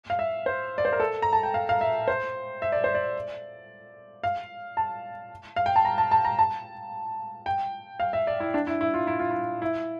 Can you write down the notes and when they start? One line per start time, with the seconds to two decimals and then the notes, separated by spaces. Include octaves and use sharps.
0.10 F5
0.19 E5
0.46 C5
0.78 D5
0.85 C5
0.93 A#4
1.00 A4
1.22 A#5
1.33 A5
1.43 G5
1.54 F5
1.69 F5
1.81 E5
2.08 C5
2.62 E5
2.72 D5
2.84 C5
2.95 D5
4.24 F5
4.77 A5
5.56 F5
5.66 G5
5.76 A5
5.85 A#5
5.98 A5
6.11 A5
6.25 A#5
6.39 A5
7.46 G5
8.00 F5
8.13 E5
8.27 D5
8.40 E4
8.54 D4
8.67 E4
8.81 E4
8.94 F4
9.07 E4
9.19 F4
9.31 E4
9.62 E4